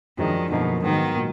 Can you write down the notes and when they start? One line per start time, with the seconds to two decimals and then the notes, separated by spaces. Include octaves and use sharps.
0.18 F#2 D#3 F3 G#3 D4
0.51 F#2 B2 D3 F3 A#3 D#4
0.83 G#2 D#3 F#3 B3
1.16 A#2 F#3